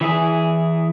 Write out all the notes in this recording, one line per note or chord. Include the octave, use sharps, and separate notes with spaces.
E3 E4 G#4